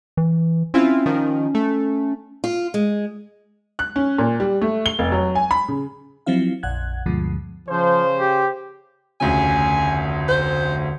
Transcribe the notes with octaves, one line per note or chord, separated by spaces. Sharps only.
E3
C4 C#4 E4 F4
D#3 F3
A3
F4
G#3
F#6
C#4
A#2
G3
A3
G7
F1
F#3
G#5
B5
C#3
F3 F#3 C4 E4 F5
A#1 F2 F#5 F#6 G#6
D2 G2 B2 D3 F3 G#3
C#3 F3 C5
G4
F1 D2 C#3 G#5
C5